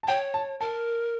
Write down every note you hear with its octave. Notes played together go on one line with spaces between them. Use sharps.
A5
C#5 G5
A5
A#4 A5